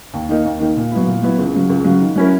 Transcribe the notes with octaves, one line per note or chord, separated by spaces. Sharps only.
D#2
D#3 A#3 D#4
D#2
D#3 A#3 D#4
A#2
F#3 B3 E4
A#2
F#3 B3 E4
C#2
C#3 F#3
C#2
C#3 F#3
D#3
F#3 C#4 E4 A#4